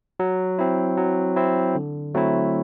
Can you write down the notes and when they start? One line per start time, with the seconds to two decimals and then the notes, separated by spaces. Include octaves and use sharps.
0.20 F#3
0.59 C4 E4
0.97 F#3
1.36 C4 E4
1.75 D3
2.15 F#3 A3 C4 E4